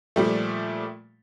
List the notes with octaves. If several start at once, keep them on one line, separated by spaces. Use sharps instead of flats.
A#2 F3 G3 A3